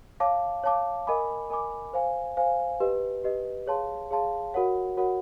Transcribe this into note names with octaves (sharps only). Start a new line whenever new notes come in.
C#5 F5 A5 D6
C#5 F5 A5 D6
A#4 D#5 G#5 B5 D6
A#4 D#5 G#5 B5 D6
C5 F5 G#5
C5 F5 G#5
G4 B4 D#5
G4 B4 D#5
G#4 C#5 F5 A5 C6
G#4 C#5 F5 A5 C6
F#4 A#4 C#5 F#5
F#4 A#4 C#5 F#5